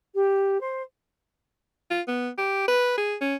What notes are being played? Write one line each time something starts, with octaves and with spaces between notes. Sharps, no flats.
G4
C5
F4
B3
G4
B4
G#4
C#4